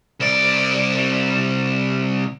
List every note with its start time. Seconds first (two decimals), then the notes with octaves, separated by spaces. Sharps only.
0.20 C2 D5